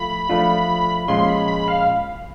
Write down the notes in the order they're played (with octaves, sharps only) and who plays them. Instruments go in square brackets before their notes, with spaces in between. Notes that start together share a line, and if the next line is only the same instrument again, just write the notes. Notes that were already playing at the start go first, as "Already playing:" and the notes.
Already playing: [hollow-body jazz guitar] F3 A3 F4 [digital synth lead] B5
[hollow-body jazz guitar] F3 A3 D4 F4
[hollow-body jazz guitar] A#2 F3 G#3 C#4 F4 [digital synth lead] C6
[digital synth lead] B5
B5
F5